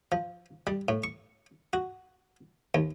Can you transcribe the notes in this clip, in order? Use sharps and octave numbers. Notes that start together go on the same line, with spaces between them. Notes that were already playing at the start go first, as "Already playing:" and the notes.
F3
G3
A2
C#6
F#4
D#2